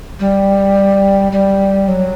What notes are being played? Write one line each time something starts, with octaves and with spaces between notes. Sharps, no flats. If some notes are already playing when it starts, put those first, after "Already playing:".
G3
G3
F#3